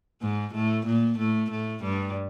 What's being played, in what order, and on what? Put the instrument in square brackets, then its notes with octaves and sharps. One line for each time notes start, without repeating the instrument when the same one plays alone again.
[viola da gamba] G#2 G#3
A2 A3
A#2 A#3
A2 A3
A2 A3
G2 G3